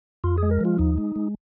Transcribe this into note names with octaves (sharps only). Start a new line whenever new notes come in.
F2 F4
G#3 G#4
A#4
F3 F4
D#2 D#4
G#3
G#3